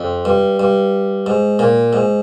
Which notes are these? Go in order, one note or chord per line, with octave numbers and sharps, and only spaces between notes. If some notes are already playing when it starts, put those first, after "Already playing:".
Already playing: F2
G2
G2
G#2
A#2
G#2